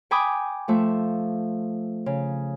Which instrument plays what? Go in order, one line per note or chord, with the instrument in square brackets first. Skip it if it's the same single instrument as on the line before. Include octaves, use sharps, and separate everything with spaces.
[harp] G5 G#5 B5 D6 D#6
F3 A3 E5
C#3